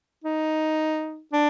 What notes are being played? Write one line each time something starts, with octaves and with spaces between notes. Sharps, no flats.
D#4
D4